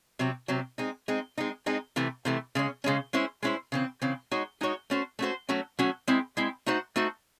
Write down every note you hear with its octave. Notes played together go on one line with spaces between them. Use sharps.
C3 F#3 C4
C3 F#3 C4
G#3 C4 D#4
G#3 C4 D#4
G#3 C4 D#4
G#3 C4 D#4
C3 E3 A3
C3 E3 A3
C#3 G#3 C#4
C#3 G#3 C#4
G#3 C#4 E4 C5
G#3 C#4 E4 C5
C#3 E3 C4
C#3 E3 C4
G#3 D#4 F#4 C#5
G#3 D#4 F#4 C#5
A3 C#4 F#4 C5
A3 C#4 F#4 C5
F#3 A3 C#4 F#4
F#3 A3 C#4 F#4
G#3 C4 E4
G#3 C4 E4
A3 D#4 F#4 C5
A3 D#4 F#4 C5